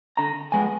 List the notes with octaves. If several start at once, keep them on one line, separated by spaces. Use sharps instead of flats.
D3 A#5
F3 G#3 B3 G#5